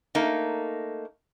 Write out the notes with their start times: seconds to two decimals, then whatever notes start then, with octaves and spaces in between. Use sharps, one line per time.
0.15 A3 A#3 D#4